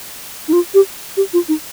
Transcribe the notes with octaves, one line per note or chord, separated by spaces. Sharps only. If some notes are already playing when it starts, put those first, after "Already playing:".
D#4
F4
G4
G4
F4
D#4